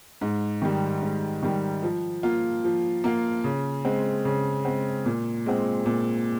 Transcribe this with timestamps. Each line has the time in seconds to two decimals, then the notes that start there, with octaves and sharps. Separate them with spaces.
0.21 G#2
0.62 D#3 G3
1.02 G#2
1.43 D#3 G3
1.83 F3
2.23 A#3 F4
2.64 F3
3.04 A#3 F4
3.44 C#3
3.85 G#3 C4
4.25 C#3
4.65 G#3 C4
5.06 A#2
5.46 G#3 C4
5.86 A#2